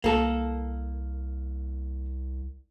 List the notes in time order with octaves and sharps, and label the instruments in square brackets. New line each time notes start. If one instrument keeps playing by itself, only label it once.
[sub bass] C2 [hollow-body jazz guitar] A#3 A4